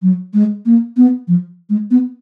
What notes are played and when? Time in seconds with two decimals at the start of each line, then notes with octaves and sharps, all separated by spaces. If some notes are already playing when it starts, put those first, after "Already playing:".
0.02 F#3
0.34 G#3
0.66 A#3
0.97 B3
1.28 F3
1.70 G#3
1.91 B3